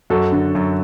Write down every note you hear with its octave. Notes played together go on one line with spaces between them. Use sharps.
F#2 F#4 A4
D3
F#2